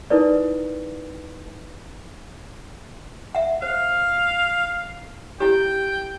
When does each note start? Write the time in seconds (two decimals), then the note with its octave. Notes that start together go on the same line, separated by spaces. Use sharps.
0.10 D#4 E4 A#4 B4 D5
3.35 E5 F#5
3.62 C5 F5
5.40 E4 G4 G5